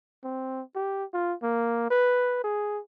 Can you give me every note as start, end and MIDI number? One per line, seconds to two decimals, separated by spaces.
0.24 0.62 60
0.75 1.04 67
1.14 1.34 65
1.43 1.86 58
1.90 2.42 71
2.44 2.80 68